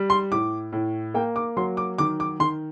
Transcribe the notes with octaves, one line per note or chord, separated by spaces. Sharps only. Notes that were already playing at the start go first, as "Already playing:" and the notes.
Already playing: G3
C6
A2 D6
A2
A#3 G5
D6
F#3 C6
D6
D#3 D6
D6
D#3 C6